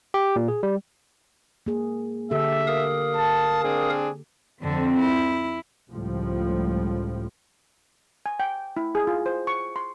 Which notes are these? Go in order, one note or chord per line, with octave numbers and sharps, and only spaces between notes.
G4
A#2
G#4
G3
A#3 G#4
D3 G4 A4 E5
A#4 F5 D#6
A5
C4 D4 G#4
F2 D3 C4
E4
C#2 A2 F3 G3
G#5
G5
E4
G#4
F4
C5
C#6
C6